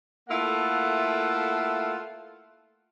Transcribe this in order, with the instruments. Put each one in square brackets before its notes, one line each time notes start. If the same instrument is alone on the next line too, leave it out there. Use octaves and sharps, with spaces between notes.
[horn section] A3 A#3 E4 F4 A4 F#5